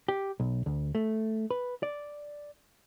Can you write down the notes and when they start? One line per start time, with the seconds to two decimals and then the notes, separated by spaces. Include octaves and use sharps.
0.08 G4
0.40 B1
0.66 D2
0.95 A3
1.51 B4
1.83 D5